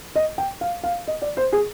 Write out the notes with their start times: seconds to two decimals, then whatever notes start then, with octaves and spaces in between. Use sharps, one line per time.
0.16 D#5
0.38 G5
0.61 F5
0.84 F5
1.08 D#5
1.22 D5
1.37 C5
1.53 G#4